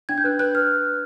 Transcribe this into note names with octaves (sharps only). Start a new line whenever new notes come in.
D4 G#6
G6
B4 F#6
B4 F#6
B4 F6